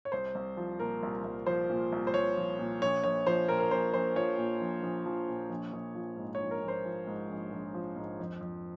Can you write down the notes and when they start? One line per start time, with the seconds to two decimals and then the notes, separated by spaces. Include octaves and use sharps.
0.05 C#5
0.12 C2 C5
0.35 C2
0.57 F3
0.80 A#2 A#4
1.03 C2
1.24 C2
1.46 F3 C5
1.70 A#2
1.92 C2
2.07 C5
2.14 C2 C#5
2.37 F3
2.59 A#2
2.82 A#1 C#5
3.04 A#1 C#5
3.27 F3 C5
3.48 A#2 A#4
3.59 A#4
3.70 A#1 C5
3.94 A#1 C5
4.16 F3 C#5
4.38 A#2
4.61 A#1
4.83 A#1
5.06 F3
5.28 A#2
5.50 A#1
5.73 A#1
5.95 F3
6.17 G#2
6.35 C#5
6.40 A#1
6.51 A#4
6.62 A#1
6.68 C5
6.85 F3
7.07 G#2
7.30 A#1
7.52 A#1
7.74 F3
7.96 G#2
8.19 F2
8.41 F2